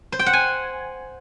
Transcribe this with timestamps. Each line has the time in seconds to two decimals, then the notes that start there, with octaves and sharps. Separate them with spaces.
0.12 C5
0.19 G5
0.26 F#5
0.33 G#5